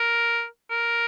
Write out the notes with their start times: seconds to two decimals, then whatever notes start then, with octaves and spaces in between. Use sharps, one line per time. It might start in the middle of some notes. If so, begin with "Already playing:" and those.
Already playing: A#4
0.70 A#4